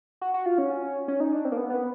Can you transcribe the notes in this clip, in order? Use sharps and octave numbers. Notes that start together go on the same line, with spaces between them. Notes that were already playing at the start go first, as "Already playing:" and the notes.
F#4
F#4
F4
C#4
C#4
D#4
D4
C4
A#3
B3
B3